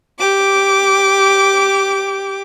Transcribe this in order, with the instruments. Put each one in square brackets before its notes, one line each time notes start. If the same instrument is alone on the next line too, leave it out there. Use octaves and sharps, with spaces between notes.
[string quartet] G4 D6